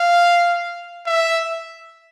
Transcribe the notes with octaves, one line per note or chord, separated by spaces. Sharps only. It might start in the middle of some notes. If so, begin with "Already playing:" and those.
Already playing: F5
E5